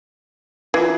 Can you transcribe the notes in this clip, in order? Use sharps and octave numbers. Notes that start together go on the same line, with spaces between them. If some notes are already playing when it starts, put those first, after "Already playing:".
E3 F4 C7